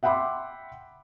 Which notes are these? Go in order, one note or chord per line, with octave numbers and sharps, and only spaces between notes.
E5 F#5 G5 B5 C6 D6